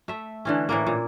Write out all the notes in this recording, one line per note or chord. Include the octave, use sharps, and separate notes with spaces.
A3 E5
D3 E3 C#4
A2 E3 A#3
A#2